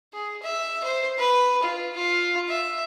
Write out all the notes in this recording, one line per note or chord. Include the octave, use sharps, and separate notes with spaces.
G#4
E5
C5
B4
F4
F4
E5